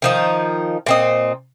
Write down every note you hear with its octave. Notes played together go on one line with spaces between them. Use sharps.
D#3 F3 D#4
A#2 C4 D#5